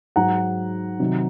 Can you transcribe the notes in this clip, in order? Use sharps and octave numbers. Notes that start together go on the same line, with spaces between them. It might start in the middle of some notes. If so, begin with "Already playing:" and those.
G#2 F#3 F#5 A#5
C3 D#3 F#3